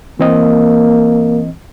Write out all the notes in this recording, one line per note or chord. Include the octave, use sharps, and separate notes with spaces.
E3 A#3 C4 D#5